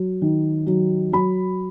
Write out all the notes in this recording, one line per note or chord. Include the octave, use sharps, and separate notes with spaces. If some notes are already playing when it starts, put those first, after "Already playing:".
Already playing: F#3
D#3
F#3
F#3 B5